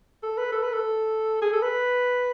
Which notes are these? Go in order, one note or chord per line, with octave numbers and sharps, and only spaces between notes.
A4
B4
A4
B4
A4
G#4
A4
B4